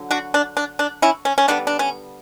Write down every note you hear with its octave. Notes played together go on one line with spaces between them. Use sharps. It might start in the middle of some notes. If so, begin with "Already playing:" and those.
Already playing: D3 F#3
D4 F#4
D4
D4
D4
C#4 E4
C#4
C#4
D3 G3 B3 D4
D4
C#4